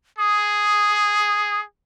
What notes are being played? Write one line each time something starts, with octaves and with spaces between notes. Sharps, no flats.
G#4 D#6